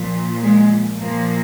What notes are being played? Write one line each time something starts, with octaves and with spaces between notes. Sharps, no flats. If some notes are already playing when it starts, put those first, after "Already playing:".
Already playing: A#2 F3
G#3
A#2 F3 A#3